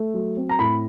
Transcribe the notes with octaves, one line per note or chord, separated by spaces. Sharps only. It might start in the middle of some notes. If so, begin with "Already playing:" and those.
Already playing: A3
F#3
C4
A#5
A2 B5